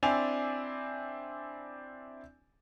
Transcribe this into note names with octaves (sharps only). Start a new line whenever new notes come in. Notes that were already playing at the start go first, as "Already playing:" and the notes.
C4 D4 E4 D5 G#5 F7